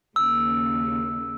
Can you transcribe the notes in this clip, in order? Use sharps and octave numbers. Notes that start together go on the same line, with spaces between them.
D#2 C#3 E6